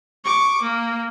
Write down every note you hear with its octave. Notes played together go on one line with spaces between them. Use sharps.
C#6 D6
A#3